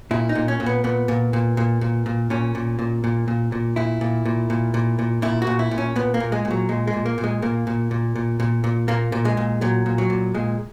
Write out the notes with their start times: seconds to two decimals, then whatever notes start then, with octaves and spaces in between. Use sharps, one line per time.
0.11 A#2 E4
0.29 D#4
0.35 A#2
0.48 C#4
0.60 A#2
0.66 B3
0.84 A#2 B3
1.08 A#2
1.33 A#2
1.57 A#2
1.81 A#2
2.06 A#2
2.30 A#2 C#4
2.55 A#2
2.79 A#2
3.04 A#2
3.28 A#2
3.52 A#2
3.76 A#2 E4
4.01 A#2
4.25 A#2
4.50 A#2
4.74 A#2
4.99 A#2
5.22 A#2 E4
5.42 F#4
5.47 A#2
5.59 E4
5.71 A#2
5.78 C#4
5.96 A#2 B3
6.14 A#3
6.20 A#2
6.32 G#3
6.45 A#2
6.51 F#3
6.69 A#2 G#3
6.87 G#3
6.93 A#2
7.06 A#3
7.18 A#2
7.24 G#3
7.42 A#2 A#3
7.67 A#2
7.91 A#2
8.16 A#2
8.40 A#2
8.64 A#2
8.88 A#2 A#3
9.12 A#2
9.25 G#3
9.37 A#2
9.61 A#2 F#3
9.86 A#2
9.98 F#3
10.10 A#2
10.35 A#2 G#3